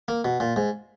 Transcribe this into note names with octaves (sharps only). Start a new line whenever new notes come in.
A#3
B2
A#2
G#2